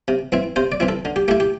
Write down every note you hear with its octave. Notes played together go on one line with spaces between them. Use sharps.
C3
E3 C4 E4
C3 C5
D5
E3 C4 E4
A4
D3
G4
A3 E4 G4
G4